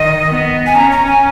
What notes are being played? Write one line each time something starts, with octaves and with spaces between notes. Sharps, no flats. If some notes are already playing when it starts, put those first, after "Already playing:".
Already playing: D#3 D#5
B3
G#5
C#4 A#5
A#5
G#5